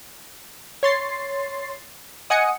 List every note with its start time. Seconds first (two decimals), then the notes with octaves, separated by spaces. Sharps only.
0.83 C#5 C6 A6 C7
2.30 D#5 F#5 G#5 D#6 C#7